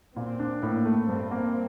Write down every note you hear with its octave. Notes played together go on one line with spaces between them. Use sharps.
A#2 C4
D4
A2 A#3
A3
G2 C4
A#3